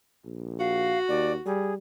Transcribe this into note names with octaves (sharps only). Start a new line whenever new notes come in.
A#1
F#4 F5
D#2 D5
G3 G#4